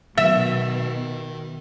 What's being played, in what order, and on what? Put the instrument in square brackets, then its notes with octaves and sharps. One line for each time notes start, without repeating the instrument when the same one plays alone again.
[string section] B2 [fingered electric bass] D#3 [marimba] F#3 [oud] E5